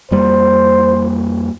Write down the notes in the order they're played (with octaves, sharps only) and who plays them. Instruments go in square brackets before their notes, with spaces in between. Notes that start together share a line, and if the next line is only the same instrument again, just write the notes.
[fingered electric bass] F2 G3 A#3 [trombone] C5